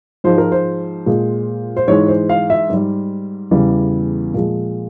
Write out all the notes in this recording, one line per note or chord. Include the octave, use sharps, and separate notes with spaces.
G#2 F3 G#3 C5
A#4
C5
A#2 G#3
C5
G#2 E3 G#3 C#5
C5
F5
E5
G#2 G3
E2 C#3 E3 G3
A#2 F3 G#3